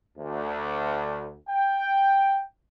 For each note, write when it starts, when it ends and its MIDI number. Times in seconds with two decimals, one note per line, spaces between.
0.19 1.34 38
1.50 2.42 79